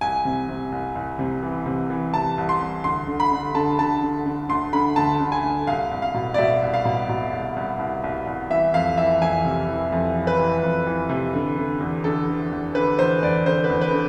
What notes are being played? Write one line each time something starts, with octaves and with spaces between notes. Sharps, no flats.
C2 G#5
C3
C3
C2
C2
C3
E3
C3
E3
C3 A5
C2
C6
C2
D2 C6
D3
B5
D3
D3 A5
D3 A5
D3
D3
D2 C6
D3 B5
D2 A5
D3
G#5
D2
C2 F5
C2
F5
B2
D5
B2 E5
C2
F5
B2
B2
C2
C2
C2
C2
C2
E3 E5
F2 F5
E3 E5
F2 G#5
C3
E3
F2
E3
B4
E3
F2
E3
C3
D3
D3
E2
D3 A4
D3
E2
D3 B4
E2 C5
E2 D5
D3 C5
B4
E2
B4
D3